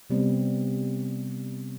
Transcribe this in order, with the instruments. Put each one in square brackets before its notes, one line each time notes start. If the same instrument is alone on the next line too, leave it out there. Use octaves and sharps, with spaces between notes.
[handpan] C3 G3 B3 C4